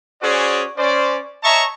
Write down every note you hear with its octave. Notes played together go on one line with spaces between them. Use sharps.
C#4 F#4 G#4 C5 D5
C#4 C5 D5
C#5 D#5 E5 A5 A#5 C#6